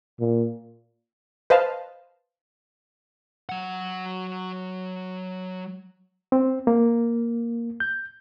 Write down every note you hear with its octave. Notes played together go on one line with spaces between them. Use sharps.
A#2
B4 C5 D#5 F5 A5
F#3 F#5
C4
A#3
G6